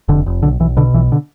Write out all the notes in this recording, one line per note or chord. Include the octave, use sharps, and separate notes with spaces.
F1 D3
F1
B1 D3
B1 E3
B2 D3
B1 E3
D3